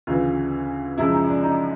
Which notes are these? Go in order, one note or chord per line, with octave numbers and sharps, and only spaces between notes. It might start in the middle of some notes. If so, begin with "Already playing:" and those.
D2 C#3 E3 F4
F#2 C#3 F3 G#3 E4
D#4
D4
D#4